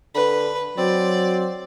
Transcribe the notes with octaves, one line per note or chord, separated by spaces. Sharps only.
D3 B4
F#3 C4 D5